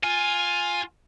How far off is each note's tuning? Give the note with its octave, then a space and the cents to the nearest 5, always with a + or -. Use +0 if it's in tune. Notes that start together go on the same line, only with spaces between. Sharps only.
F4 +10 G#5 +0